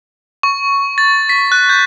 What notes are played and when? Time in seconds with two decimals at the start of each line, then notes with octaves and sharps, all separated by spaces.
0.43 C#6
0.98 A6
1.29 B6
1.52 F#6
1.69 G6